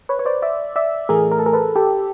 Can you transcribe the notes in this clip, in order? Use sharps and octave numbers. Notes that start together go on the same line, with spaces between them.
B4 C#5
C#5
C5 D5
D5 E5
D5 E5
A2 E3 A3 G#4 A#4
A#4
A4
G#4 A#4
A4 B4
G4 A4